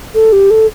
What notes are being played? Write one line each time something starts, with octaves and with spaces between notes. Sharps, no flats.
A4
G4
A4